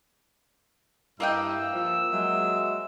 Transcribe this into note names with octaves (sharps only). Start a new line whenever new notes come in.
G2 A#3 E4 D#5 G5 E6
F3
F#3 G#3 E5